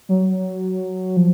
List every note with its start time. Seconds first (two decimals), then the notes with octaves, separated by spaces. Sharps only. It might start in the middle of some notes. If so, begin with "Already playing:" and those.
0.09 F#3
1.17 F3